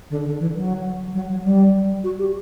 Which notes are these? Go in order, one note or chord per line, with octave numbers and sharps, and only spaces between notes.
D3
D3
E3
F#3
F#3
F#3
G3
F#4
G4